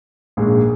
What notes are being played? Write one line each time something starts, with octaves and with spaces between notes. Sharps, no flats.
A#1 G#2 G#3